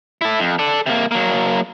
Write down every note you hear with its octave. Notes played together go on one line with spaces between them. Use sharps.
E4 A4
F2
A4 D5
C3 A#3
F#3 A#3